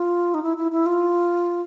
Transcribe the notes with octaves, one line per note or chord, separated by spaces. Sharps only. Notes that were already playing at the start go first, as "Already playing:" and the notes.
Already playing: F4
D#4
E4
E4
E4
F4